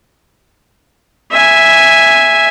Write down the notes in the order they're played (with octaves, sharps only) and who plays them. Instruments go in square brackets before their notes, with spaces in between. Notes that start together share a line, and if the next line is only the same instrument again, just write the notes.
[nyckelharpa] E5 G#5